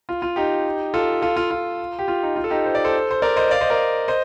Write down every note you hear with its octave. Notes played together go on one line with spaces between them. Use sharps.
F4
F4
D#4 G4
F4 A4
F4 A4
F4
F4
G4
F4
D#4
F4
A4
D#4 G4
C5
D5
A4 C5
C5
A#4 D5
C5 D#5
D5 F5
C5 D#5
A#4 D5
C5 D#5